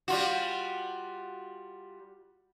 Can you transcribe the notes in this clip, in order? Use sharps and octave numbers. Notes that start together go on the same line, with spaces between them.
G3 F4 F#4